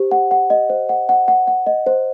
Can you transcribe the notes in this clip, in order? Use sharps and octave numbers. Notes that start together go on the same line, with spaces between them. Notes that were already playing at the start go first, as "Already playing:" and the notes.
Already playing: G4 C5
F#5
F#5
D#5
C5
F#5
F#5
F#5
F#5
D#5
C5